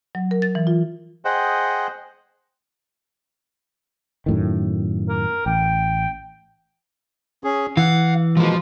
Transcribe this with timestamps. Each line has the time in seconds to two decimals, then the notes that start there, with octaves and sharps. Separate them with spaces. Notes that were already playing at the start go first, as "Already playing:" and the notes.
0.15 F#3
0.31 A#4
0.42 A6
0.55 E3
0.67 F4
1.25 G#4 C5 D#5 F#5 G5
4.26 F#2 A2 D#3
5.09 A#4
5.46 A1 G5
7.44 C#4 G#4
7.77 E3 F5 F#5
8.37 B2 F3 G#3 A#3 F4